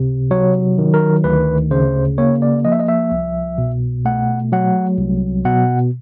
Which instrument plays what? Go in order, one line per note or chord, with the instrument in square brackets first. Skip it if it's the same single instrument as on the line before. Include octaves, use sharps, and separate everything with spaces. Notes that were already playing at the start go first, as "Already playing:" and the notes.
Already playing: [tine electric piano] C#2 C3
F#3 C#5
D#3
A#4
D2 B4
C#3 C5
A#3 C#5
D5
F3 D#5
E5
D#5
E5
C2
B2
A3 F#5
F#3 F#5
C2
B2 F#5